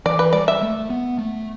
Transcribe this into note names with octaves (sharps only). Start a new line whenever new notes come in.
E3 D5
B4
G3 D5
E5
A3
B3
A3